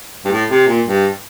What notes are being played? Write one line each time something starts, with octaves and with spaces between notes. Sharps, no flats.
G2
A2
C3
A#2
G2